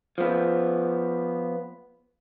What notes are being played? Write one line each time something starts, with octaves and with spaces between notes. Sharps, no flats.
F3 B3